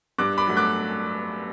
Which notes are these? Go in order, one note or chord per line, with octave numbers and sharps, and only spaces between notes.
G2 D6 F#6
B5 D6
F#3 A3
D6 F#6